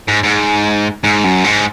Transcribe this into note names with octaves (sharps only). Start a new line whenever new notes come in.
G#2
G#2
G#2
F#2
G#2